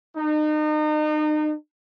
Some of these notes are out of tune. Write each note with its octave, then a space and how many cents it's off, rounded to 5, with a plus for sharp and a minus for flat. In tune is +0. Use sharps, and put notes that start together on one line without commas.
D#4 -35